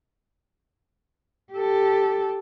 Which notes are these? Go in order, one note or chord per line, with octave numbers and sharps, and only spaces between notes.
G4 A4